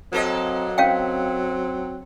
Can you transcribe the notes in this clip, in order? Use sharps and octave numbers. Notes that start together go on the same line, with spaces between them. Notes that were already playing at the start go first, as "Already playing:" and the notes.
F#3 A#3 C4 A4 D#5
C4 C#4 F5 G5